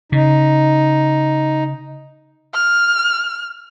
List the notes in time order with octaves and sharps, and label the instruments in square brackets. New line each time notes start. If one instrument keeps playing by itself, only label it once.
[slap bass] C#3 [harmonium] D#4
[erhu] F6